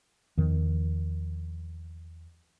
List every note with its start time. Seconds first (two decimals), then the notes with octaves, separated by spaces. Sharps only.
0.37 E2 D#3 F3